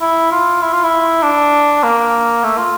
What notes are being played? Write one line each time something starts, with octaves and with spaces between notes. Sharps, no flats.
E4
F4
E4
F4
E4
D4
A#3
A3
F4